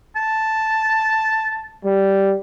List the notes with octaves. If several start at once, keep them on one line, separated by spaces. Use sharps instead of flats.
A5
G3